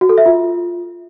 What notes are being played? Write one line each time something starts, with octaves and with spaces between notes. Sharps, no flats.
F#4
A4
E5
F4